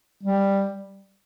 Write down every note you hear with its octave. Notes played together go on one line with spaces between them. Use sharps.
G3